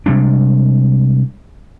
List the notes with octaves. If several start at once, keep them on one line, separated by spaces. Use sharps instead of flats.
C3 G3 G#3 D4